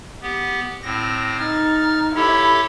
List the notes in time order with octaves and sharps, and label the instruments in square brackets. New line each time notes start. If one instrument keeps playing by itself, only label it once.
[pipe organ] B3 G4
A2 C4 A#6
[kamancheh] D#4 [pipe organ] F6 A6
[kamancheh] E4 B5 [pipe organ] G4 A4 C#5